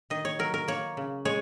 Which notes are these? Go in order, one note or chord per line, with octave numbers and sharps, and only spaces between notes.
D#3 D#5
C#5
F#3 A#4
A#4
A#3 C#5
C#3
G#3 C#5